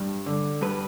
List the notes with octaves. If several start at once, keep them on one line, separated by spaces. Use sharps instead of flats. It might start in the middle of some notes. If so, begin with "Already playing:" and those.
Already playing: G2
D3
G2 B4